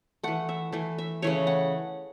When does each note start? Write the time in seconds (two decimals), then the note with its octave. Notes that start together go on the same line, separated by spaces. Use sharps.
0.23 E3 A3 F#5
0.49 E5
0.72 E3 A3
0.98 E5
1.22 C#3 E3 A3 C#5
1.47 F#5